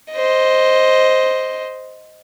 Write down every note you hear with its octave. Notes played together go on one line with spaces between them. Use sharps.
C5 D#5